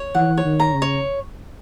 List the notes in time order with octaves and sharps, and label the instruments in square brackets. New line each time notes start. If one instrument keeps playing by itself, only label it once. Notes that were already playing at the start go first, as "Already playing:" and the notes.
Already playing: [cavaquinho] C#5
[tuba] E3 [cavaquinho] F#5
[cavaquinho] C#5
[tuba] D#3
[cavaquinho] A#5
[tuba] C#3
[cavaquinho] C#5